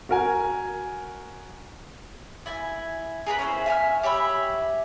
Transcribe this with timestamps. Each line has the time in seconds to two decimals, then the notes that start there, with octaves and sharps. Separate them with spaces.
0.09 F#4 A#4 G#5
2.46 E4 G#5
3.26 G#4 A#4 B4 B5
3.39 C#4 E4 A#4 C5
3.66 E5 G#5 B5 F6
4.03 G4 C#5 E5 B5